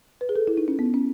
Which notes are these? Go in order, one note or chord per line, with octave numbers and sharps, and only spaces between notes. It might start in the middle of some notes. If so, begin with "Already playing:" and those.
B4
G#4
A4
E4
D#4
C#4
B3
C#4